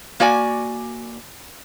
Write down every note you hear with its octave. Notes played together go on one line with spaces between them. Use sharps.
A#3 F#4 D5 G#5